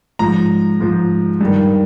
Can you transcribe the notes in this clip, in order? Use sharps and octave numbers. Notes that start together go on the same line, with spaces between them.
G#2 F3 A#5
G#2 F3
G2 D#3